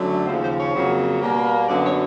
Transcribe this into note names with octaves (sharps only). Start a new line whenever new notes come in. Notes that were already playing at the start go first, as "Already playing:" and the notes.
Already playing: F#2 D3 F#3 A3
D#2 C#3 F3 C5
C5
C#5
F2 C#3 F#3 A#3
B2 G3 A#3
F#2 D3 F#3 B3 D5
C#5